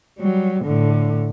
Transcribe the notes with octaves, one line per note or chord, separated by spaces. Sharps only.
F#3 G3
A2 D3